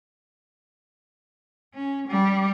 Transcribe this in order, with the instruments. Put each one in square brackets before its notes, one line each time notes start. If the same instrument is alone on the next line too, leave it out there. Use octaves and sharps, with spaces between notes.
[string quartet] C#4
G3